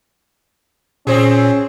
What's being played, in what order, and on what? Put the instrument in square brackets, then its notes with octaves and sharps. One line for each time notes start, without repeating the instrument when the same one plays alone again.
[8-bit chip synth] A#2 [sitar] C4 G#4 [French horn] C#4